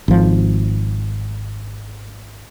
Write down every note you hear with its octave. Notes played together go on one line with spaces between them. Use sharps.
G#1 F3